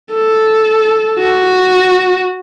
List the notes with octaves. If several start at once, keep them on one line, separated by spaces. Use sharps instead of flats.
A4
F#4